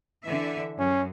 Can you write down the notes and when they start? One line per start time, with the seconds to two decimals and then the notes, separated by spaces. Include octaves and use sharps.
0.24 D3 E3 E5
0.79 F#2 C#4